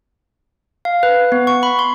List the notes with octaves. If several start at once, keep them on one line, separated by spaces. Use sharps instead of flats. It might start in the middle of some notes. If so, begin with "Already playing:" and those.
F5
B4
B3
C#6
B5
C6